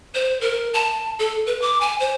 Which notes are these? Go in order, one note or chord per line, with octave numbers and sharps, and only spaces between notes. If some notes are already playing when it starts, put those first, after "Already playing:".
C5
A#4
A5
A4
B4
D6
G#5
C5